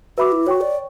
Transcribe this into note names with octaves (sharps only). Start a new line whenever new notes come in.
F#4 B4 E5 B5 D6
E4
F#4 C#5 G5 C#6
D5